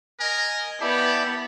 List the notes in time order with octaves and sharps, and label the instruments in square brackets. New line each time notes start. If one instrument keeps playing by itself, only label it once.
[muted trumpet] A#4 [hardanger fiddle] D#5 [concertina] G#5
[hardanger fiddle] B3 [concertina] E4 D5 A5 [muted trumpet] G4